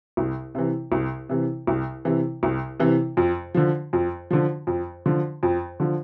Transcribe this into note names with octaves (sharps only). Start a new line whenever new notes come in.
C2
C3 E3
C2
C3 E3
C2
C3 E3
C2
C3 E3
F2
D3 F3
F2
D3 F3
F2
D3 F3
F2
D3 F3